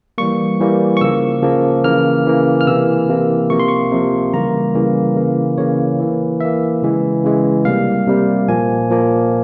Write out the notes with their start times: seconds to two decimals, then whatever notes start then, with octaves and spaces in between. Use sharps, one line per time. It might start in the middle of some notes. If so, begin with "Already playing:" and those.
0.18 E3 G3 A#3 C#6
0.60 E3 G3 A#3
0.97 C#6
1.01 C#3 F3 A#3 E6
1.43 C#3 F3 A#3
1.84 C#3 E3 A#3 F6
2.27 C#3 E3 A#3
2.61 F6
2.67 C3 E3 A#3 E6
3.09 C3 E3 A#3
3.50 C3 F3 A#3 C#6
3.60 C6
3.68 C#6
3.92 C3 F3 A#3
4.34 C#3 E3 G3 A#3 A#5
4.75 C#3 E3 G3 A#3
5.16 C#3 E3 A#3
5.58 C#3 E3 A#3 C#5
6.00 E3 A#3
6.40 E3 A#3 E5
6.83 C#3 E3 G#3
7.24 C#3 E3 G#3
7.65 C3 G3 A#3 F5
8.07 C3 G3 A#3
8.48 A#2 F3 A#3 G#5
8.90 A#2 F3 A#3